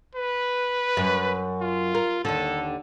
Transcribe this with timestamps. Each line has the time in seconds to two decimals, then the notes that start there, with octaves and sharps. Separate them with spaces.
0.15 B4
0.97 F#2
1.61 F4
1.95 A#4
2.25 D#2 D3 A4